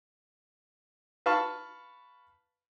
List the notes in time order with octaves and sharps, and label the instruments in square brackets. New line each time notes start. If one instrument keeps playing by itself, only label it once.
[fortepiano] B4 F5 A5 C#6